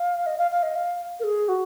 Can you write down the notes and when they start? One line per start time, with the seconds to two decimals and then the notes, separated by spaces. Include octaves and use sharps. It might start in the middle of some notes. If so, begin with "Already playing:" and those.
Already playing: F5
0.26 D#5
0.38 F5
0.51 F5
0.63 D#5
0.76 F5
1.20 A#4
1.24 G#4
1.49 F#4